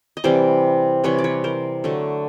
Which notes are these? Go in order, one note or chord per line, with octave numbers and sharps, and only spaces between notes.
D#5
C3 E3 G3 C5 D5
C3 E3 G3 B4 C#5
D5
B4 C#5
A#4 C5
D3 F#3 A3